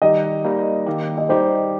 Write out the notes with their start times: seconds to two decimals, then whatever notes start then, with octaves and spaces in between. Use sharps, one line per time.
0.02 D#3 G3 D#4 G4 D#5
0.44 G3 A#3 D#4
0.86 D#3 A#3 G4
1.18 D#5
1.29 G3 D#4 G4 C5